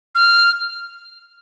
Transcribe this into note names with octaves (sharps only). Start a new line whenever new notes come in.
F6